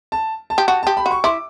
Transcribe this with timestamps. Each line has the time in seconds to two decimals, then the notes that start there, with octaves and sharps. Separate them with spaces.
0.12 A5
0.50 A5
0.58 G4
0.68 F#4 A5
0.83 G4 A5
0.97 B5
1.06 F#4
1.11 C#6
1.24 E4 D6